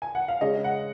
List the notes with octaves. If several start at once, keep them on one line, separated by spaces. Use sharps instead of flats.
G#5
F#5
F5
C#3 G#3 C#4 D#5
F#5